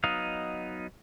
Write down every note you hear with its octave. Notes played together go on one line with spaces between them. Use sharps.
F#3 B3 D#4 D#5 F5